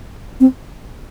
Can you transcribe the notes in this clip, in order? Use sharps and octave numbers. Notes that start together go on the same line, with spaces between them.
C4